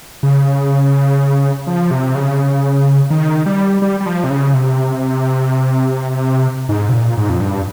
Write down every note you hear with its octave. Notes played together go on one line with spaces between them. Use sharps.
C#3
F3
C3
C#3
D#3
G3
G3
G3
F3
C3
C#3
C3
G#2
C3
A#2
G#2
F2
G2